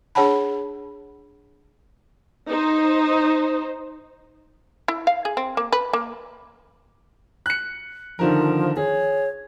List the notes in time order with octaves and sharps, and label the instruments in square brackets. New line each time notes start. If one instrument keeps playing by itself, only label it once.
[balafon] D4 G#4 C#5 F#5 A5 B5
[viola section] D#4 C5
[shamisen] E4
F5
G#4
C4
A#3
B4
A#3
[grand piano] F#6 C#7
[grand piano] D3 D#3 A#4 [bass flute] F3
[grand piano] G#4 [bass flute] C#5